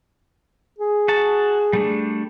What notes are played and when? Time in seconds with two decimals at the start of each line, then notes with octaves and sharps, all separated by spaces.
0.79 G#4
1.08 F#4 A5
1.73 G3 A3 D4